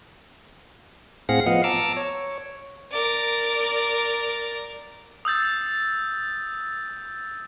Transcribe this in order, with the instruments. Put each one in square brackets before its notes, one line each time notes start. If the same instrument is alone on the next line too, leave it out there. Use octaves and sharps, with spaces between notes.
[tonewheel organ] A2 C4 G#4 F5 F#5 A#6
F3 B3 D#5 F5 F#5
A5 A#5 D6 E6
C#5
[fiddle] A#4 D5
[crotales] D#6 E6 G6 A6